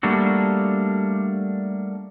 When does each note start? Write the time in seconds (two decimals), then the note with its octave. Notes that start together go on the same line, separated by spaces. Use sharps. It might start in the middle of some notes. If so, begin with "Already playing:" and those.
0.03 G3 A3 A#3 D4 F#4